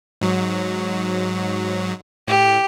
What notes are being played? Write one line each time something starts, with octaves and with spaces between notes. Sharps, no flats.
G#2 F#3
A2 G4